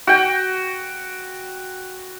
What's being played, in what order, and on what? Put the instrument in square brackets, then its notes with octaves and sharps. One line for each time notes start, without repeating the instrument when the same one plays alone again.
[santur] F#4 G5